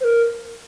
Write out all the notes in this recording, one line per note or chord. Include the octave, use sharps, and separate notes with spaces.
C5
A#4